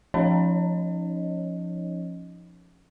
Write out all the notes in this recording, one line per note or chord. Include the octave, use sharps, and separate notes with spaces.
F3 C#4 D#4 C#5 D#5